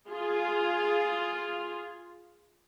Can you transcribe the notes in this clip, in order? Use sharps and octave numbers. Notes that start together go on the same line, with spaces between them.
F4 G#4